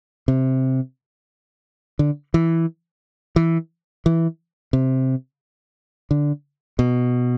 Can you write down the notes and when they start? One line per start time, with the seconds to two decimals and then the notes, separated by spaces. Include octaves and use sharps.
0.28 C3
1.99 D3
2.34 E3
3.36 E3
4.06 E3
4.73 C3
6.11 D3
6.79 B2